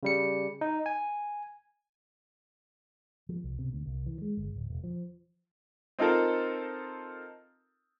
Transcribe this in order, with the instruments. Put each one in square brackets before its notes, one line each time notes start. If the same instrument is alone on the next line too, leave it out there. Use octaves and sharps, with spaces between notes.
[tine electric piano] C#3 G3 C#7
D#4
G#5
[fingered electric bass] F3
C2
C3
D2
C2
E3
G#3
G1
D1
E1
F3
[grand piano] C4 D#4 F4 A4 A#4